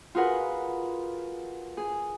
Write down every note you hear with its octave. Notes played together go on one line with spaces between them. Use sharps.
F4 F#4 G#4 A#4 B4 F#5
G#4